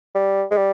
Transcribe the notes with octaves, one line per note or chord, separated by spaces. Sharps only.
G3
G#3
G3